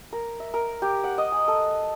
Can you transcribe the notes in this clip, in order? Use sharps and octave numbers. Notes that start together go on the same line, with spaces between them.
A#4
E5
A#4
G4
F#5
D#5
G#5
A4